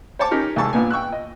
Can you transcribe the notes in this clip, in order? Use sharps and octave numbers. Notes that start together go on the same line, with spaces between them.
C5 C#5 A5 D6
C#4 D#4 G4 A#4
C2 E3 G#3 A5 C#6 E6
A#1 A#2 B3 G#5
G5 C#6 E6 F#6
D#5